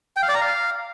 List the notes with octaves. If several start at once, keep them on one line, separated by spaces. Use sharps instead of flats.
G5
F5
D5
A#5
F5